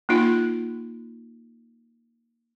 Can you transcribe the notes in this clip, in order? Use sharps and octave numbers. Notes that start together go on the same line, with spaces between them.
A#3 D#4 F4